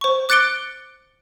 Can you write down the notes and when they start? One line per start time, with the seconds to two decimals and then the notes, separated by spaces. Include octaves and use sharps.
0.01 C5 C#6
0.29 D6 F#6 A6 C#7 D7 G7